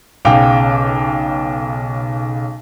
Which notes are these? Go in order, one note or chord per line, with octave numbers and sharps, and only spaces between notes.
B1 C#3 F5 G5 G#5 D6